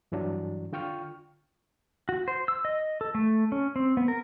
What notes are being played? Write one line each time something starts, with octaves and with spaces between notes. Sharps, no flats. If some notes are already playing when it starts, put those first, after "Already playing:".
G2 E3 F#3 D4
D3 F4 G5 C#6 F6
F#4
C5
E6
D#5
A4
A3
C#4
C4
B3
A#4